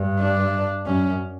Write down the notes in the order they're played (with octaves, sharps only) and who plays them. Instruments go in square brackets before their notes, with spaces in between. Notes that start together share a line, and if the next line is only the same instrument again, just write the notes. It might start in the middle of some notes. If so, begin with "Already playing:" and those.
Already playing: [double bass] G2
[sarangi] D4
[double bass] F#2 [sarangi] C#4